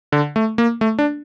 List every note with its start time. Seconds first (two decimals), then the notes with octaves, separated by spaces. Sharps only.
0.12 D3
0.36 A3
0.58 A#3
0.81 A3
0.99 D4